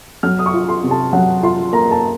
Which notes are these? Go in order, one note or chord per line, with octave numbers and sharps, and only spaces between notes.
F#3 F6
D#6
C#6
F4
C6
C3
A5
F#3 F#5
F4 C6
A#3 A#5
A5